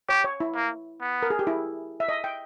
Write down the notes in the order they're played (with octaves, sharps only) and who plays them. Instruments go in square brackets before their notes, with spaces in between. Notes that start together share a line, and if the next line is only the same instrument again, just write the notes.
[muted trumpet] G4 [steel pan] C#5
[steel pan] C#5
E4
[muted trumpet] A#3
B3
[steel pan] A#4
G#4
G4
E4
E5
D#5
G5